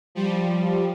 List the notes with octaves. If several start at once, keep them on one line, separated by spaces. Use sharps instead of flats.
F3 G3